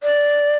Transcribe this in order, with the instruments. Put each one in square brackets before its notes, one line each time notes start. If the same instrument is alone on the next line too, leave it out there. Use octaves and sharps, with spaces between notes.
[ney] D5